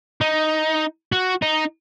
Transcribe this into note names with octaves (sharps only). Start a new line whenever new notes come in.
D#4
F#4
D#4